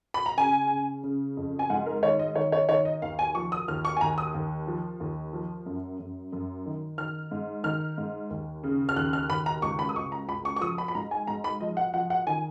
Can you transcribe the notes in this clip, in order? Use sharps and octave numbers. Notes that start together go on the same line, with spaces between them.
B5
A#5
C#3 G#5
C#3
C#3
F2
G#5
G#2 F#5
A#4
D#3 C#5
D#5
D#3 C#5
C#5
D#3 C#5
D#5
D#2 F5
G#5
F3 C#6
D#6
D#2 F6
C#6
G#5
D#2 A#5
D#6
D#2
F3
D#2
F3
F#2
F#2
F#2
D#3
D#3 F6
G#2
D#3 F6
G#2
D#2
C#3
F6
D#2 F#6
F6
D#2 B5
A#5
C#2 C#6
B5
D#6
C#2 C#6
A#5
C#2 B5
C#6
C#6
F3 D#6
B5
B5
G#2 A#5
G#5
G#2 A#5
B5
F3 D#5
F#5
F3 F#5
F#5
D#3 G#5